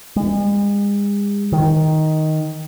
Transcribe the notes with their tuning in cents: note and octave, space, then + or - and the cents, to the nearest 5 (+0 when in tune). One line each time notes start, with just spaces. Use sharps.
G#3 -40
D#3 +5